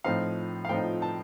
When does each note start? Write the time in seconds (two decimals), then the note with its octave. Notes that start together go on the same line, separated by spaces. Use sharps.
0.04 A2 F3 C4 D#4 F5
0.65 F5
0.69 A2 F3 C4 D#4 G5
1.02 A5